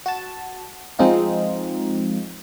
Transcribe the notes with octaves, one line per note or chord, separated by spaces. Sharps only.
F#4 A5
F3 G#3 C4 D#4 F4